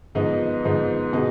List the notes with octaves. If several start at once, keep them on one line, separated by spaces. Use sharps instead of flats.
G#2 F3 B3 D#4
G#2 F3 B3 D#4
B2 B3 D#4 G#4